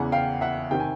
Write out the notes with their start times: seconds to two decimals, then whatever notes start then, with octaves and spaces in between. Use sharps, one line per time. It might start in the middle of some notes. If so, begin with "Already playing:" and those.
Already playing: E2 C#3 E3 F#5 G#5
0.12 F5 G5
0.41 E5 F#5
0.71 C3 D#3 G5
0.80 G#5